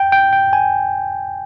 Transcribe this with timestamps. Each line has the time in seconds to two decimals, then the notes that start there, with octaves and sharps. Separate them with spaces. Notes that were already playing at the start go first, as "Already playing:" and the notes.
Already playing: G5
0.12 G5
0.33 G5
0.53 G#5